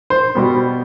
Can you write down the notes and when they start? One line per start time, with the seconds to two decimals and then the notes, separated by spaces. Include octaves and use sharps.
0.10 C5
0.35 B2 G3 B3